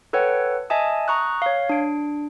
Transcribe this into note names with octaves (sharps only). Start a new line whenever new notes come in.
A4 B4 C#5 F#5 G5
D#5 E5 G#5 A5 D#6
A#5 C#6 D#6 F#6
C#5 F5
D4 D7